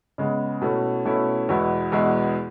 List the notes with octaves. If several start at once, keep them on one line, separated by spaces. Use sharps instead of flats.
C#3 G#3 B3
B2 A3 C#4 E4
B2 A3 C#4 E4
E2 B2 G#3 B3 E4
E2 B2 G#3 B3 E4